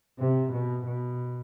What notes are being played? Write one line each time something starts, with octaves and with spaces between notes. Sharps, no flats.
C3
B2
B2